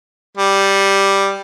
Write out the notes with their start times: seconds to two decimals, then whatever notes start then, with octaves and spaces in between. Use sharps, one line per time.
0.37 G3